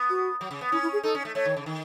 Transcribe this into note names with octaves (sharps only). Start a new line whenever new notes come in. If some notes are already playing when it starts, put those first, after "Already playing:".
Already playing: B3
F#4
F#3
C#3
B3
C#4 E4
E4
G#4
D#4 A4
C#4
A3
A3 C#5
D#3
C#3
D#3